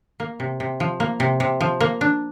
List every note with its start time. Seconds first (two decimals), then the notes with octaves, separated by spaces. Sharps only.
0.20 A#3
0.40 C3
0.60 C3
0.80 F3
1.00 A#3
1.20 C3
1.40 C3
1.60 F3
1.80 A#3
2.01 D4